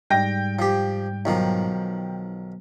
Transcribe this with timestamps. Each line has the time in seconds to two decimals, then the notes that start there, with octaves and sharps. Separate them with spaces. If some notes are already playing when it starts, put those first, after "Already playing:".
0.10 G#2 G3 G5 A#6
0.59 F3 G4
1.25 B1 D#3 F3